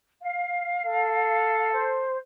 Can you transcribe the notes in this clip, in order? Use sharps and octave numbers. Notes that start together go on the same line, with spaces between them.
F5
A4
C5